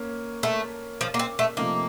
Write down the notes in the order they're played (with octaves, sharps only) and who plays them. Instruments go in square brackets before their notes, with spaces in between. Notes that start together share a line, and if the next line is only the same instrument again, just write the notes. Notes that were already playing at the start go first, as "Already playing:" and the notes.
Already playing: [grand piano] A#3 C#4 C#5
[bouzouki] A3
F3
A#3
C4
A3
[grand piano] C3 F3 A3 C4 D#4 [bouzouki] A#3